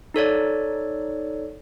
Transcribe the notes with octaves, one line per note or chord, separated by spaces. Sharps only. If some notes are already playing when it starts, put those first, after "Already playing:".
D#4 A4 C#5 D5